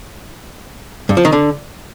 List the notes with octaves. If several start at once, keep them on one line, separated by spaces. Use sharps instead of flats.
G2
F3
D#3
D3